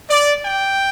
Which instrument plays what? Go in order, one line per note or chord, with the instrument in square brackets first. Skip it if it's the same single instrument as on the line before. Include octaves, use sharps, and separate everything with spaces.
[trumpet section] D5
G5